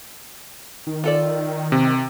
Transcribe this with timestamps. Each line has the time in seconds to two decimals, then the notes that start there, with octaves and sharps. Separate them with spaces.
0.87 D#3
1.04 F4 A4 D5
1.72 C3